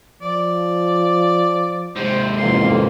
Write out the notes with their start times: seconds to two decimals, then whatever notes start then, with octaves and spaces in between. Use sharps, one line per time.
0.22 F3 D5
1.96 G#2 C3 C5
2.39 A1 F2 A#3 C6